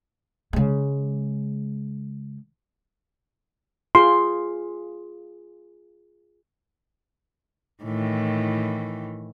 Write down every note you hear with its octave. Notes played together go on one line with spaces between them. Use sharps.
C#3 G#3
F4 G#4 C6
A2 D#3 E3